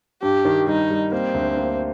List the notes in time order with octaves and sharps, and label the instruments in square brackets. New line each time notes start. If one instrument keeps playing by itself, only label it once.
[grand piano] G2 [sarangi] G4
[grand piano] D#3
[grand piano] G3 [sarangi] D#4
[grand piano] G3
[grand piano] A#3 [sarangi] C4
[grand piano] D2
A#3